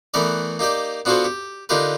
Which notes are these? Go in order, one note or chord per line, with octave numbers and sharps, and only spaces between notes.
E3 A3 B3 A#4 D5
A#3 D#4 G4 D5
B3 D4 F4 F#4 A4 C5
G4
D3 D#4 F4 G4 A#4 B4